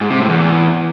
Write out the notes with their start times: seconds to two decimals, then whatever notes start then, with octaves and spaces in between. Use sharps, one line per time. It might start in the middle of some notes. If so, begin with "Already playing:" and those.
0.01 G#2
0.10 C3
0.20 A2
0.29 E2